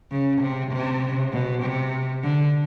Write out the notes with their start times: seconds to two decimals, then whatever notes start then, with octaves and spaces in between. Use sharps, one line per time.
0.12 C#3
0.41 C3
0.72 C3
1.33 B2
1.63 C3
2.24 D3